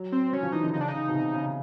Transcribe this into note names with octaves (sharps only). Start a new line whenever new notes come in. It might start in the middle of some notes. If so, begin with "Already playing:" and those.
Already playing: F#3
C4
F#3 C#4
F3
E3 D#4
D3
C#3 D#4
D4
D#4
C#3
B2
C3
C#3